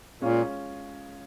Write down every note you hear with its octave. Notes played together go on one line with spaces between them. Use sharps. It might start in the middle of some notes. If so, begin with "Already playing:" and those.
A#2 G#3 C#4 F4